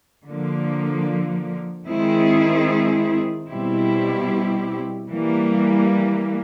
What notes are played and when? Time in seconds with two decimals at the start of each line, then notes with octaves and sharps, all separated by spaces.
0.24 D3 F3 A#3
1.86 D#3 G#3 C4 E4 G#4
3.48 B2 G3 C4 E4 G4
5.09 E3 G3 A#3